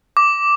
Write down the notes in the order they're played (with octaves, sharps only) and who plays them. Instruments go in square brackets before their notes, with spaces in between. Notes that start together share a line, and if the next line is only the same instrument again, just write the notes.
[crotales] D6